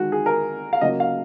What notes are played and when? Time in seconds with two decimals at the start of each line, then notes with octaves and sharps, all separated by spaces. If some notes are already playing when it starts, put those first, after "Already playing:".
Already playing: D#3 G#3 F#4
0.12 G#4
0.26 A#4
0.73 F5
0.81 C#3 F#3 A#3 D#5
1.00 F5